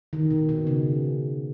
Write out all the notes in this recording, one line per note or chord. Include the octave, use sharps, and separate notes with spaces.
D#3
B2
B2
C#3